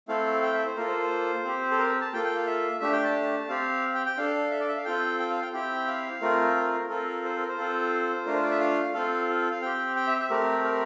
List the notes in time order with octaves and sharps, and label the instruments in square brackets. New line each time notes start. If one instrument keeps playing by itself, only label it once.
[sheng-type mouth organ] A3 C4 E4 A4 F5
G5
E5
C5
A#3 F4 A4 A#4
C5
C5
C4 G4
A4
A#4
A5
A#3 F4 A4 G5
G5
F5
E5
A3 D4 G4 E5
G5
A5
C4 G4 F5
G5
G5
D4 A4 F5
E5
D5
E5
F5
C4 F4 A4 G5
G5
F5
G5
C4 E4 G4 G5
F5
A3 C4 F4 A#4
A#4
C4 F4 A4 A#4
C5
A#4
C5
C4 F4 A4
A3 D4 F4 A#4
C5
D5
E5
F5
C4 F4 A4 F5
F5
C4 G4 G5
G5
E5
E5
A3 C4 G4 A#4
A#4